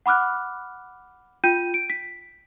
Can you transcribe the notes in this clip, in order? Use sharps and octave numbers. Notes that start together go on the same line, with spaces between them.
F#5 B5 D6 F6 F#6
F4 G5 G6 D#7
D7
B6